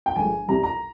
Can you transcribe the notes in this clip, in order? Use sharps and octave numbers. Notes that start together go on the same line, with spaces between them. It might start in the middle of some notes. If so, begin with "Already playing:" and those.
G5
G1 G2 F3 G#3 G#5
C2 C3 G3 C4 A#5
A#5